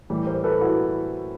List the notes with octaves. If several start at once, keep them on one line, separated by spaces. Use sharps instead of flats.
A2 E3 G3
A#4 C5
A4 B4
E4 F#4